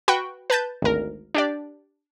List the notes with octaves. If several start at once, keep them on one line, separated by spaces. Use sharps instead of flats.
F#4 B4 G5 B5 C#6
B4 A5 G6 A6
G#1 D2 A#4
D4 G4 D5